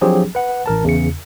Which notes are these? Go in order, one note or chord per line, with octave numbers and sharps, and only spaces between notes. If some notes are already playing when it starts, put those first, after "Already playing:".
F3 F#3 C4 D4 G4 G#4
B4 F#5
A1 A#4 A5
E2 C#3 C#7